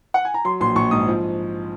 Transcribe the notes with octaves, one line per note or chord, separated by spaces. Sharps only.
F#5
G#5
A#5
F#3 C6
A#1 C6
A#1 C#6
G#2 D#6
F3